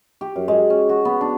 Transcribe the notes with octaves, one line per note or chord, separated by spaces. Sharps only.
G4
F#2
G#3
C#4
F#4
B3
D4